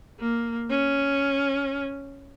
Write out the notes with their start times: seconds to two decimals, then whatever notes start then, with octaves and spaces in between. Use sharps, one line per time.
0.19 A#3
0.70 C#4